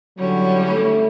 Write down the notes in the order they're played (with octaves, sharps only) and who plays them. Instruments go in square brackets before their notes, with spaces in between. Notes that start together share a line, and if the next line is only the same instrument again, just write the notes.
[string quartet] D3 G3 C#4 E4 [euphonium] F#3
[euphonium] A3